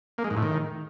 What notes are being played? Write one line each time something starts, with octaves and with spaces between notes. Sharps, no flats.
A#3
G#3
G#2
A2
D#3